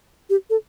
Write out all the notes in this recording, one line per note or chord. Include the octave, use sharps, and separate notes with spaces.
G4
A4